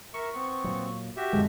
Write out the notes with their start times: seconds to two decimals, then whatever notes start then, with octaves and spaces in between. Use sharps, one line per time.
0.14 A#4 E5 C#6
0.34 B3 C4
0.64 A#2 F#3
1.17 F#4 G4 E5
1.33 F2 A2 D3 G#3